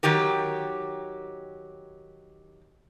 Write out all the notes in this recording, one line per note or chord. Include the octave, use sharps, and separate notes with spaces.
D#3 F#3 G4 A#4